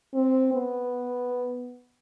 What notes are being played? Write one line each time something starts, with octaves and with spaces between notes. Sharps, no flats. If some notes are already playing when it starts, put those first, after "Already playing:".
C4
B3